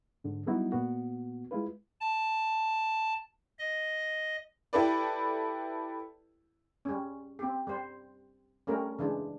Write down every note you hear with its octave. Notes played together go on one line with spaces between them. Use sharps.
G#2 D3
F#3 G3 B3 D#4 E4 F#4
A#2 B3 F#4
G#3 E4 F4 B4
A5
D#5
E4 G4 A4 B4 D5
G3 C#4
C4 G4
G3 C5
G3 A3 C#4 A#4
C#3 E3 G#3 D4